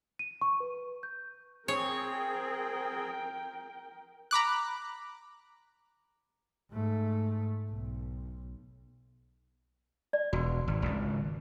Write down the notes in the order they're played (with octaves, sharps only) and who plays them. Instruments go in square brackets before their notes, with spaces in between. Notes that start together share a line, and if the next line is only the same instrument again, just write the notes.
[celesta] D#7
C#6
B4
G6
[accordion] C4 G#4 [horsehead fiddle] A#4 G5 [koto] C#5
[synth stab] A#5 B5 D6 F#6
[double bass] G#2 A3
B1
[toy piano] D5
[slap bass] E1 [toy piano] F#4
[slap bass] G#1
G#1 C#2